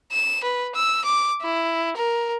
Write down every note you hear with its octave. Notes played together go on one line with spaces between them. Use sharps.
E7
B4
E6
D6
E4
A#4